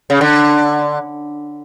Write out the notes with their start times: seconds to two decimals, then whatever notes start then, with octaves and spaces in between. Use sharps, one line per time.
0.10 C#3
0.21 D3